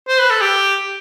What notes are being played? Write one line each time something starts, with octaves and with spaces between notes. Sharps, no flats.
C5
B4
A4
G4